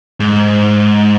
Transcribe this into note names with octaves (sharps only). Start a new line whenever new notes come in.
G#2